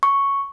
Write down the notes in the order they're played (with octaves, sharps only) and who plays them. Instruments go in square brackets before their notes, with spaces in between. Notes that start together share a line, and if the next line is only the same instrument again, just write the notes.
[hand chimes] C#6